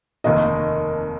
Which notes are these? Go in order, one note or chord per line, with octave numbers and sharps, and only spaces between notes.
F1 D#2 D#3 A#3 D#5